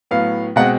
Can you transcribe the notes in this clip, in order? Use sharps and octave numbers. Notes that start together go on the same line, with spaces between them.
A2 F#3 B3 F5
B2 G#3 C4 F#5